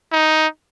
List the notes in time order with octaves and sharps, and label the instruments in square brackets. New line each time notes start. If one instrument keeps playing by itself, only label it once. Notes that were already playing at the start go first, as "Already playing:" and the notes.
[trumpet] D#4